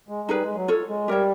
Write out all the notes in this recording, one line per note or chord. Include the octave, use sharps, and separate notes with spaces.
G#3
G3 D#4 G#4 B4
G#3
F#3
F4 A4 C#5
G#3
G3 G4 A#4 C#5 E5